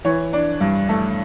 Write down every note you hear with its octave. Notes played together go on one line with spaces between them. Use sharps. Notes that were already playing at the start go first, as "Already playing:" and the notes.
E3 C#5
D4
G2
A3